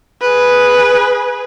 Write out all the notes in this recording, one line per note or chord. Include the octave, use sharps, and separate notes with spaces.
G#4 B4